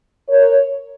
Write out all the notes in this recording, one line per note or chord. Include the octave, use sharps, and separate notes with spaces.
A#4 C#5